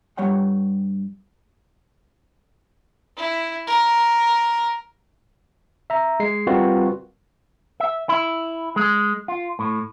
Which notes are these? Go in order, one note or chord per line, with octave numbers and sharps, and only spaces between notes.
G2 G3 C#5 F#5 G5
E4
A#4
E5 A#5
G#3 C7
G3 C4 F4 F#4 A#4 B4
E5
E4
G#3
F4
A2